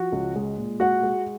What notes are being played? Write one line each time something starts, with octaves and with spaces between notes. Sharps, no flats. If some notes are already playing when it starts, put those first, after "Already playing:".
Already playing: F3 F#4 F#5
C#2
G#3
A#2
G#3 F#4 F#5
G#3